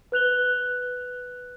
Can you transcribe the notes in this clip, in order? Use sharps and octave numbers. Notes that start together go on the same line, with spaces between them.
B4 F#6 F7 G7